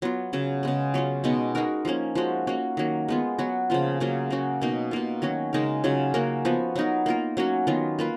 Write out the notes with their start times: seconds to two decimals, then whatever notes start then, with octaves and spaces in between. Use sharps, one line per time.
0.02 F#3 B3 F4
0.33 C#3 F#3 C#4
0.63 C#3 G#3 B3
0.94 F#3 C#4 F4
1.24 B2 G#3 B3 D#4
1.55 G#3 D#4 F#4 A#4
1.85 F3 A#3 C#4
2.15 F3 G#3 C#4 F#4
2.47 A#3 C#4 F#4
2.77 D#3 F#3 A#3
3.08 G#3 B3 F4
3.38 F#3 B3 F#4
3.70 C#3 F3 A#3 F4
4.00 C#3 F#3 A#3 F4
4.30 A#3 C#4 F#4
4.62 B2 A#3 D#4
4.91 B2 A#3 F4
5.22 D#3 F#3 C#4 F#4
5.53 C#3 G#3 D#4 A#4
5.84 C#3 F#3 C#4 F4
6.14 A#3 C#4 F#4 A#4
6.45 F3 B3 F#4
6.76 F#3 B3 D#4 A#4
7.06 A#3 F4 A#4
7.37 F#3 A#3 C#4 F#4
7.67 D#3 F#3 B3 F4
7.99 A#3 F4 B4